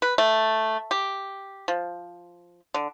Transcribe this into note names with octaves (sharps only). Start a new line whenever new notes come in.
B4
A3
G4
F3
D3